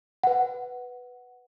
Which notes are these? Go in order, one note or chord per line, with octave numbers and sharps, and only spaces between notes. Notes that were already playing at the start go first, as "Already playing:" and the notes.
B4 F#5